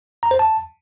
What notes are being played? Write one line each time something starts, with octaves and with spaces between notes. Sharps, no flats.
A#5
C5
A5